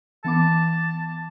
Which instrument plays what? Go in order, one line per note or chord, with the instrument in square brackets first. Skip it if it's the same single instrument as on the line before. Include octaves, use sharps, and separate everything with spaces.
[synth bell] E3 B3 D6 [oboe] A5